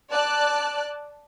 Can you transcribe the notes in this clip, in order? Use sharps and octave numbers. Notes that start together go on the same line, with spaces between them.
D5 A5 F#6